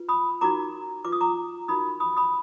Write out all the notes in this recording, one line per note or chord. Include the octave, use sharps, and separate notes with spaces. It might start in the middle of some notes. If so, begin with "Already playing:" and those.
Already playing: F4 B4
B5 D#6
D#4 F#4 A#4 A#5 D6
F4 B4 D6
D#6
A#5 D6
D#4 F#4 A#4 B5 D#6
B5 D#6
B5 D#6